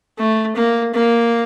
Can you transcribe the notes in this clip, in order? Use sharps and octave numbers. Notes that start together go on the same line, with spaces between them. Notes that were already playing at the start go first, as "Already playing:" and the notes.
A3
A#3
A#3